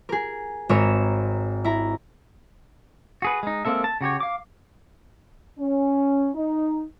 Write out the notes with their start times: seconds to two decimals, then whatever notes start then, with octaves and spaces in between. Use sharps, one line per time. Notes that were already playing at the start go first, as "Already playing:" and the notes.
0.09 G#4 A#4
0.69 G#1 A#4 C#5 E6
1.64 E4 A#5
3.22 F#4 G#4 B4
3.43 G#3 D#4
3.65 G#3 A#3 C4 A4 E5
3.84 A5
4.01 C#3 F#4 G4 C#5
4.20 F5 D6
5.59 C#4
6.35 D#4